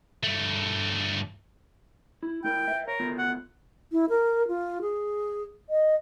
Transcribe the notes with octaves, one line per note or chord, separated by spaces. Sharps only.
G2 A3
E4
A3 E4 A#4 G5
B4 E5
A#4 C#5
A3 B3 F4
F#5
E4
A#4
F4
G#4
D#5